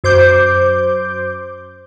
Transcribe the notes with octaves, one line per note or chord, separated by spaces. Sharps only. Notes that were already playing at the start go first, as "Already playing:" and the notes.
F#2 C5 D6 G6